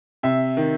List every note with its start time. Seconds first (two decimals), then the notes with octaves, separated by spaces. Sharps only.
0.23 C3 E5
0.57 D#3